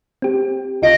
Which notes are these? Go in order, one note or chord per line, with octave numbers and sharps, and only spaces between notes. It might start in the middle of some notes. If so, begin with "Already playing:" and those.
C4 G4
C#2 F4 D#5 D7